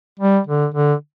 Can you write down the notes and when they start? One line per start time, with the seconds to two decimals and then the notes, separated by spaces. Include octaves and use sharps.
0.19 G3
0.47 D3
0.75 D3